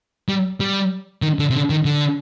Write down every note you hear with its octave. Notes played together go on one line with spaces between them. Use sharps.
G3
G3
D#3
D3
C3
D3
D#3
D3